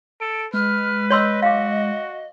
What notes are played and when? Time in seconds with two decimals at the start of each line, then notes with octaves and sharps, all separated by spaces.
0.21 A4 D7
0.54 G#3 B4 F6
1.11 C#5 D#5 C6 E6
1.42 F#4 F5 D6